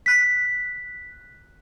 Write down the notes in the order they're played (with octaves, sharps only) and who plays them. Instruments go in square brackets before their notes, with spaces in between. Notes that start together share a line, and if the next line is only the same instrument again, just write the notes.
[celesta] F#6 B6